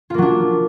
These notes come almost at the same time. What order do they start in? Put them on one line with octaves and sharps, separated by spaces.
F4 A#3 F#3 D4